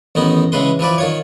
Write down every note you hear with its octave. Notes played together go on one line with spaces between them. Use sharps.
A1 D#3 B3 D#4
C#3 E3 G#3 B4 C6
E3 F3 B4 D5
D#3 F4 C#5